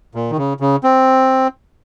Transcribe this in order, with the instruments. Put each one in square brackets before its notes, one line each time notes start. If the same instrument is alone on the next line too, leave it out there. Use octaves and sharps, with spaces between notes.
[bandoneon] A#2
D#3
C#3
C#3
C4